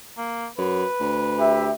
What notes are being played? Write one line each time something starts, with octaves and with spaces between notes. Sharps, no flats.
A#3
F#2 B4
D2
G4 E5